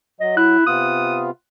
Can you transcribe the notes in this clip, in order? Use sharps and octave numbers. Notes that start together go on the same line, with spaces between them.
F#3 D#5
E4 F#6
C3 B3 F4 D#6